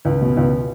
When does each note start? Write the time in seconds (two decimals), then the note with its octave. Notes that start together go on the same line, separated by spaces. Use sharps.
0.05 C#2
0.22 B2
0.37 C#2